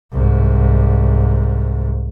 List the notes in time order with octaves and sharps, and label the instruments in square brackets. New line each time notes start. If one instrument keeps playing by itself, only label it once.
[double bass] C2 G#2